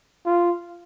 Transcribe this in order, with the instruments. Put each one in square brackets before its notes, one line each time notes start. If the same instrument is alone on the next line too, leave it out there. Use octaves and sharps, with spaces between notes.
[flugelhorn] F4